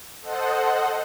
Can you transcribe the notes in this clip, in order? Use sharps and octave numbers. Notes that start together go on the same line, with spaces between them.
A4 C5 D#5 F#5